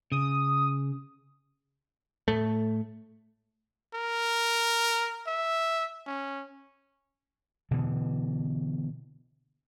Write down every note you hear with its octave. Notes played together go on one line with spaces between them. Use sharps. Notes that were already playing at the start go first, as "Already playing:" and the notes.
C#3 D#6
A2 A3
A#4
E5
C#4
B2 D3 E3